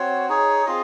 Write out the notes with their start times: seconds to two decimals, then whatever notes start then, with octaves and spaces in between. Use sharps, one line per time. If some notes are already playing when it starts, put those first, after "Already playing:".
Already playing: C4 F#4 C#5
0.29 D#4 G#4 C#5
0.66 C4 F4 G#4 D#5